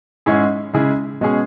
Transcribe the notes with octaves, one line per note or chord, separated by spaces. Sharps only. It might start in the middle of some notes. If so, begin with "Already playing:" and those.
G#2 G#3 C#4 E4 G#4
C#3 G#3 E4 G#4
B2 G#3 C#4 G#4